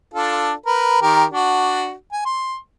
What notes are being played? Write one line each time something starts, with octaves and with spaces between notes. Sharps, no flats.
D4 F4 A4
A#4 B4
D#3 G4 A#4
D4 F#4
G#5
C6